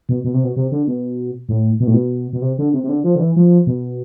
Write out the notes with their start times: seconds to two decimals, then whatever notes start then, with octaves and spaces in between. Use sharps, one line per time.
0.09 B2
0.24 B2
0.34 C3
0.44 B2
0.56 C3
0.72 D3
0.87 B2
1.49 A2
1.80 B2
1.87 A2
1.94 B2
2.33 B2
2.42 C3
2.58 D3
2.73 C3
2.83 C3
2.89 D3
3.04 F3
3.15 D3
3.20 E3
3.36 F3
3.67 B2